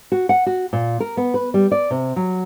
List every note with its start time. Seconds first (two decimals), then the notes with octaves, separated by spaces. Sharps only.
0.12 F#4
0.29 F#5
0.46 F#4
0.73 A#2
1.00 A#4
1.17 B3
1.34 B4
1.54 G3
1.71 D5
1.91 C3
2.16 F#3